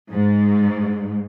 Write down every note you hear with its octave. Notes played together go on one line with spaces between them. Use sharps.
G#2